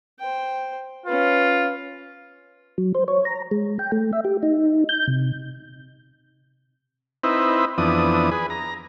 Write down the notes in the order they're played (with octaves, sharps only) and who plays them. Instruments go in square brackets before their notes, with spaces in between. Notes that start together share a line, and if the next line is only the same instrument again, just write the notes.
[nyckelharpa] C5 G5
[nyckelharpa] C#4 B4 [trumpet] F4
[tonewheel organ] F#3
C5
C#5
A#5
G#3
G5
A3
E5
G4
D#4
G6
C3
[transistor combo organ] C4 D#4 E4 B4
F2 E3 B3 D4 D#6
G#4 B4
A#5